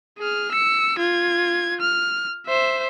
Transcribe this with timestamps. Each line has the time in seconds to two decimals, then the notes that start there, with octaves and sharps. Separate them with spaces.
0.18 G#4 F6
0.52 E6 C#7
0.99 F4 G#6
1.81 F6
2.46 C5 E5